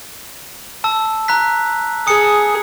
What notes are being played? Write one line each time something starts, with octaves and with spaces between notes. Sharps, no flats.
A5 E6
A#5 F#6 B6
G#4 D#6 C#7